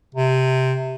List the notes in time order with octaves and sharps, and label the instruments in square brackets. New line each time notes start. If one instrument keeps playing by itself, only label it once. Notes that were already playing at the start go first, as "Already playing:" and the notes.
[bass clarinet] C3